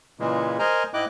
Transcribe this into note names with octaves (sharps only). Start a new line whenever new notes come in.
A#2 C#3 E3 G#3
A#4 C5 D#5 G#5 A#5
G#2 E4 D#5 G5 D6 F#6